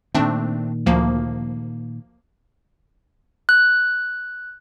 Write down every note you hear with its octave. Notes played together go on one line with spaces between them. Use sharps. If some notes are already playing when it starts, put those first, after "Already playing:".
A#2 D#3 A3 C4 D4
D2 F3 A#3
F#6